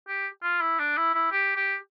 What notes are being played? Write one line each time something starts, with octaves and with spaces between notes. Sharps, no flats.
G4
F4
E4
D4
E4
E4
G4
G4